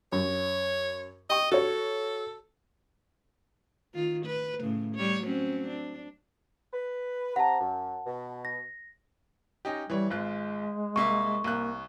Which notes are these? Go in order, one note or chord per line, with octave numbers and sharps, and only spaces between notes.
F#2 C#5
D#5 G5 C#6
F#4 A4 C#5
D#3 F4
B4
A2 C#3
G3 C#5
F#3 C4 C#4
D4
B4
C3 F#5 A5 A#5
F#2
B2
A#6
C#4 D#4 G4
E3 G3 C#5
G#1 G#3 F4 F#6
C2 A#3 E5 C#6
C2 A#3 F#6